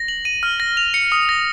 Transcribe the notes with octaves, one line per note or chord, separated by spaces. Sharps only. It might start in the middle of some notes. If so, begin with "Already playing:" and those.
Already playing: A#6
F#7
D#7
F6
A#6
F7
C#7
D#6
A#6